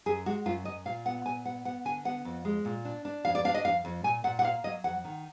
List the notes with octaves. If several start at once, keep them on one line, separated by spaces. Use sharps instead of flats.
F#2 G#4
G#3 F#4
F#2 F4
F#2 D#5
A#2 F5
B3 F#5
A#2 G#5
B3 F#5
B3 F#5
D3 G#5
B3 F#5
F2
G#3
A#2
D4
D4
F2 F5
D5
D4 F5
D#5
F2 F5
F2
A#2 G#5
A#2 F#5
F#5
A#3 F5
F#3 D#5
F2 F#5
D#3